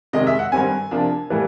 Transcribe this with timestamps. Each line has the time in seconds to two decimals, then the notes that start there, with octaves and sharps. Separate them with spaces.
0.13 C3 D#3 G#3 D#5
0.27 E5
0.39 F#5
0.52 G2 D#3 G3 C4 G#5
0.91 C3 F3 A#3 D4
1.30 A2 E3 G3 A#3